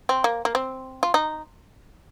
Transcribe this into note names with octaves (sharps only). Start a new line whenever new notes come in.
C4
A#3
A#3
C4
F4
D#4